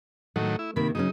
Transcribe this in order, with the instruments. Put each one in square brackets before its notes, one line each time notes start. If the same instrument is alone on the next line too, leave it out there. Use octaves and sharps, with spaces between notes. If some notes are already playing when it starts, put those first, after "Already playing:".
[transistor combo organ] A2 D#3 F#3 [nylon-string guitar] A3
[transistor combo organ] E4
[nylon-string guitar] C3 D#3 A#3 [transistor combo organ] B5
[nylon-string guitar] C#3 F#3 C#4 [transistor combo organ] D#4